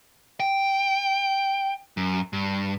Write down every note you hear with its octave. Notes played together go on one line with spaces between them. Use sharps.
G5
F#2
G2